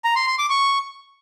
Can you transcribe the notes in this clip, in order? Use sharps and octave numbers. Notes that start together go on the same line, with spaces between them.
A#5
C6
C6
D6
C#6